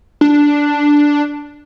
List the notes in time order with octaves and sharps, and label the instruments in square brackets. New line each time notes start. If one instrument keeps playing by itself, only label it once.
[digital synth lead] D4